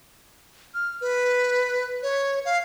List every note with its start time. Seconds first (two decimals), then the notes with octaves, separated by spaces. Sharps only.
0.74 F6
1.01 B4
2.03 C#5
2.45 F5